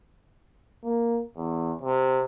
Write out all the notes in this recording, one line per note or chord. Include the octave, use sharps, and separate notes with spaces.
A#3
E2
C3